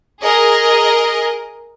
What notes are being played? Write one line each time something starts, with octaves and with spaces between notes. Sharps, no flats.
G#4 A#4 D#5